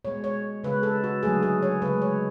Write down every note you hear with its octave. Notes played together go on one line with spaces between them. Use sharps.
B2 G#3 C#5
C#5
C#3 G#3 B4
A4
F#4
D3 F#3 A3 G#4
G#4
C#5
C#3 G#3 B4
C#5